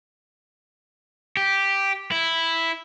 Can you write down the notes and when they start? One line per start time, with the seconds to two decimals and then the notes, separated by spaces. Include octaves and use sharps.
1.37 G4
2.12 E4